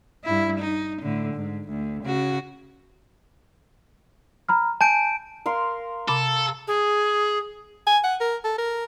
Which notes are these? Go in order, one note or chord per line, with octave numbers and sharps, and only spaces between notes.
G2 E4
D#4
A2 D3
G#2
D2
C#3 F#4
A#5 B5 F6
G#5 A5 G6 D7
A#4 F5 C6
C3 A4 B5 D6
G#4
G#5
F#5
A#4
A4
A#4